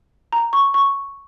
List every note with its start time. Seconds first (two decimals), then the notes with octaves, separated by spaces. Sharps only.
0.33 A#5
0.53 C#6
0.74 C#6